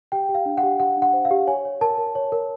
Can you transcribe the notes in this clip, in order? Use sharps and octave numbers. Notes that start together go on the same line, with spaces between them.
G4 G5
G4
F5
D4
F#5
G4
G4 F#5
D4 F#5
C5
F5
G4
C#5 G#5
C#5
A#4 A5
A#4
C#5
A#4